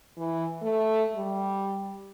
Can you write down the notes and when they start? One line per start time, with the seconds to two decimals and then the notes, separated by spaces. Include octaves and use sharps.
0.17 E3
0.62 A3
1.16 G3